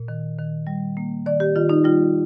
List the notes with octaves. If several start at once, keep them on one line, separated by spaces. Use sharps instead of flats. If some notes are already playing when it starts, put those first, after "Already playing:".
Already playing: A#2
D#3
D#3
G3
A#3
D#3 D5
G4
D#3 F4
D#4
G3 F4